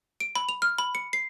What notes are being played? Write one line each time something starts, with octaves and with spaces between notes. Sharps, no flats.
D7
B5
F7
F6
B5
C#7
C7